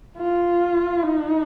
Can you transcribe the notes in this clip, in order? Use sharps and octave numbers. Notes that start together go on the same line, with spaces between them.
F4
D#4